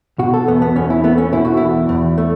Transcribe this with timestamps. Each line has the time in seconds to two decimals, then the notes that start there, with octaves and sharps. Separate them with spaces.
0.19 B2 F#4
0.34 A4
0.48 E2 B3
0.62 B3
0.76 E2 C#4
0.90 E4
1.04 A3 B3
1.18 C#4
1.32 B2 E4
1.45 F#4
1.57 E2 E4
1.89 E2
2.18 A3